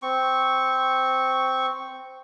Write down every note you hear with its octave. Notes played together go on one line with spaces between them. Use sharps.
C4 C#6